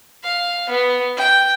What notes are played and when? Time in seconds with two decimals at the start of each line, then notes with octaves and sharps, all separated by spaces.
0.23 F5
0.69 B3
1.17 G5